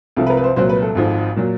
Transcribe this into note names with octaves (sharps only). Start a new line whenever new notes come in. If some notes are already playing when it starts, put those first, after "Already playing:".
C2 C3 F3 A4
B4
A#4
B4
C5
C2 A#2 F#3 C5
B4
A4
G#1 G#2 F3
A#2 F#3